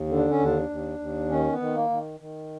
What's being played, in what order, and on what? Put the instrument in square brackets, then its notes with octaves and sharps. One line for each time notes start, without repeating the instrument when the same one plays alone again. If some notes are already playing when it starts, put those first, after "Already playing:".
Already playing: [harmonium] D#2
D3
D4
C#4
D#2
D4
D#2
D#2
D#3 C#4
B3
D#3
A#3
D#3
D#3